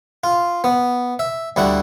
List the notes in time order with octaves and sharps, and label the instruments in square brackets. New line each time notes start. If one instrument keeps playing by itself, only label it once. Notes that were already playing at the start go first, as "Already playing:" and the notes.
[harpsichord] F4
B3
E5
D2 G3 E4 F#5